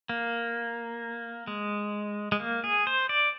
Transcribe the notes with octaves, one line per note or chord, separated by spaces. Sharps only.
A#3
G#3
G#3
A#3
G#4
C5
D5